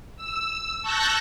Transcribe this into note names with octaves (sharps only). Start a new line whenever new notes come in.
E6
A5 C#6 E6 F#6 G6 A#6